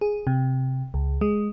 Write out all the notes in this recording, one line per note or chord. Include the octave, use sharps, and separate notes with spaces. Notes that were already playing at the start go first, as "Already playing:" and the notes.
G#4
C3
C#2
G#3